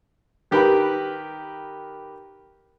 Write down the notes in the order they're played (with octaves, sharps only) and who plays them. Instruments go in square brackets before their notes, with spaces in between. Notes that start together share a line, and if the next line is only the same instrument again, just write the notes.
[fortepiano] D#3 G4 A#4 B4 G5 B5